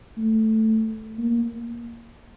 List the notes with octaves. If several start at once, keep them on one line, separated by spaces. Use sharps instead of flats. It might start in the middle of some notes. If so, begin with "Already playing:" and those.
A3
A#3